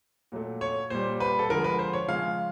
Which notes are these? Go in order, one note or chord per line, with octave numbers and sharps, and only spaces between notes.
A#2 F#3 A3
C#5
A#2 G3 C5
B4
A4
D3 F3 G#3 A#4
B4
C5
C#5
C#3 F3 G#3 F5